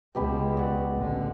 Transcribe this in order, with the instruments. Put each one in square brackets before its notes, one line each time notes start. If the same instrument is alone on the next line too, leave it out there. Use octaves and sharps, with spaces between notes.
[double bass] C#2 [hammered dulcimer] B2 G4 B5
[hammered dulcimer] D5 F#5
[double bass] A1 D3